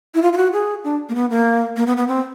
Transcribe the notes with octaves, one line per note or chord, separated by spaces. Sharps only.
E4
F4
F4
F#4
G#4
D4
A#3
B3
A#3
A#3
B3
B3
C4